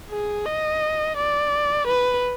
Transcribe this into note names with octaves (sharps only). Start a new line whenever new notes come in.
G#4
D#5
D5
B4